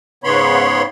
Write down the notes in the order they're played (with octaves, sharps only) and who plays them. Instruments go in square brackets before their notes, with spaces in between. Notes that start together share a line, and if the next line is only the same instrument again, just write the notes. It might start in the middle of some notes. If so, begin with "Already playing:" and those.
[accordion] G#2 C#3 B3 C#5 B5 C6